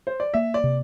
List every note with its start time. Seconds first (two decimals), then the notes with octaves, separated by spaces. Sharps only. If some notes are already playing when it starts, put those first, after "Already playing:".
0.07 C5
0.20 D5
0.34 A#3 E5
0.54 D5
0.64 C3